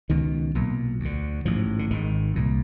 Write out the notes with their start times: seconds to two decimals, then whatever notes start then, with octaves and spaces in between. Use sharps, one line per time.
0.10 C#2 B2 D#3
0.55 B1 A#2
1.00 D2
1.05 D3
1.45 A1 G#2 F3
1.79 D3
1.91 G#1 G#2 D#3
2.36 C2 A#2